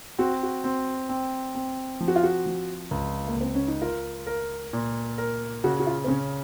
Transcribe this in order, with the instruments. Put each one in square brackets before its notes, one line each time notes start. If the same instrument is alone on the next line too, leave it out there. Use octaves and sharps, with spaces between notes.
[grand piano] C4 [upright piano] F#4
[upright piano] F#4
[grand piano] C4
C4
C4
F3
[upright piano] F#4
F4
F#4
[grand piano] F3
C#2
[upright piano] A#3
[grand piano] C#2 [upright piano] C4
[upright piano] C#4
D#4
[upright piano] F4 [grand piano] A#4
[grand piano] A#4
A#2
A#4
[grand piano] C#3 [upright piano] F#4
[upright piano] F#4
F4
C4
[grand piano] C#3 [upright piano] C#4